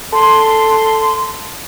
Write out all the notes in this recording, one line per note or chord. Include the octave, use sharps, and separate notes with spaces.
A4 C6